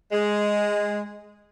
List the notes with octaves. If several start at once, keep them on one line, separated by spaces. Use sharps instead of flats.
G#3